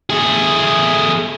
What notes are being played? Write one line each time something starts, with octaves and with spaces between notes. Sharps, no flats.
A3 G#4